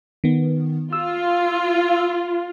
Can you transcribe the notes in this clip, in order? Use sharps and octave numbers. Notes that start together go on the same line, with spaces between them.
D#3 B3
F4 E6